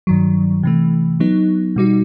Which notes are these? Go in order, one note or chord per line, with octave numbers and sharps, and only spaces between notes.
G2 D#3 F#3
C3 E3 A3
F#3 B3 D#4
B2 G3 D#4 F#4